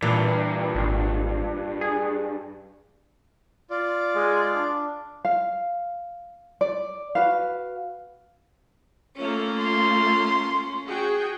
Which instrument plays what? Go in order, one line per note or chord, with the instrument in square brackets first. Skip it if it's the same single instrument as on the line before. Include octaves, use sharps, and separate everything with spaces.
[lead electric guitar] G2 [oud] A#2 [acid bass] E3
[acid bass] G#1
G#4
[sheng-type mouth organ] F4 D5
[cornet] G#3
D4
[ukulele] F5
D5
F#4 B4 F5
[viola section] A3 A#3 F4 [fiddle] C#4
[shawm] C6
[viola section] F#4 G#4 G5